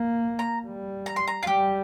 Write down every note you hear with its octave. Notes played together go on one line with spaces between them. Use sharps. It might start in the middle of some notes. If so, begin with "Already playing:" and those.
Already playing: A#3
A#5
G3
A#5
C6
A#5
F4
G3 G4